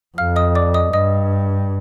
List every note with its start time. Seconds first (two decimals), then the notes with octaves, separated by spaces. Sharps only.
0.18 F2 F5 F6
0.36 D#5 D#6
0.55 D5 D6
0.74 D#5 D#6
0.93 G2 D#5 D#6